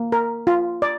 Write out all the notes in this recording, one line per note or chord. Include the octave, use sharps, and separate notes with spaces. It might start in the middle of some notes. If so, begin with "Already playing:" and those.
Already playing: A#3
A#4
F4
D5